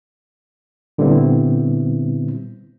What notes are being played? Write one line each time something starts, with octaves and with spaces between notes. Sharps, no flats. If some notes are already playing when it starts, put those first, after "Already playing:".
A#2 D3 G3 B3 C4 E4